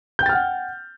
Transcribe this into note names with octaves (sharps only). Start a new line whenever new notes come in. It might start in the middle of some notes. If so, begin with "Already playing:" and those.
F#5 G5 F6 G6 A6